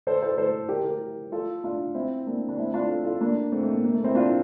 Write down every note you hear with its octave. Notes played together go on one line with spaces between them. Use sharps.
A4 C5
A4 C5
A4 C5
G4 A#4
G4 A#4
F4 A4
D4 F4
C4 E4
A#3 D4
D4
C4 E4
D4 F4
F4 A4
F4 A4
A#3 D4
A3 C4
A3
A#3
A#3
A3
C4 E4
D4 F4